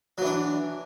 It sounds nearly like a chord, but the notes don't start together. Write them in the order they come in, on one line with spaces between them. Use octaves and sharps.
F#3 E3 D4